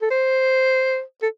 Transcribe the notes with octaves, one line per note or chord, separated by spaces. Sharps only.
A4
C5
A4